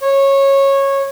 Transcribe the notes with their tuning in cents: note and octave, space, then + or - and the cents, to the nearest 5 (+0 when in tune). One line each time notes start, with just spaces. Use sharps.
C#5 -15